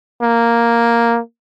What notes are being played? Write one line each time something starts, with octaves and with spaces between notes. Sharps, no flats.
A#3